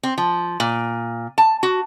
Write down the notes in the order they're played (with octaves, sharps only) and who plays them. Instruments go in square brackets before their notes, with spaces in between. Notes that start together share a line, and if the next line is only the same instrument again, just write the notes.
[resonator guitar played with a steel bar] C4
F3
A#2
A5
F#4